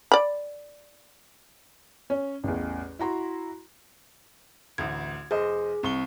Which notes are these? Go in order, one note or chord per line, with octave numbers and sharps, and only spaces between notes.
D5 B5
C#4 C#5
A1 E2
E4 F#4 A#5 C6
A1 D2 G#6
F1 G#4 C5 D#5
C2 C4 C#6 G7